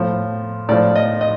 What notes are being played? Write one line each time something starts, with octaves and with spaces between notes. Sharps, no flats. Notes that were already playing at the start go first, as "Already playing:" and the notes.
Already playing: A2 F3
A2 F3 D5
D#5
D#5